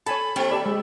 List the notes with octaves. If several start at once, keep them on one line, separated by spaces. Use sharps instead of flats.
A4 C#5 G#5 A5 B5
D#2 C4 A4 G5
G4 A4 D5 E5
G#3